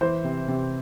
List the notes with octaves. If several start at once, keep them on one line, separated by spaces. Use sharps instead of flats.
E3 C5
C3
C3